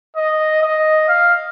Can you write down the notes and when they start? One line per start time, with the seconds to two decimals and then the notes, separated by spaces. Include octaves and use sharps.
0.17 D#5
0.62 D#5
1.08 F5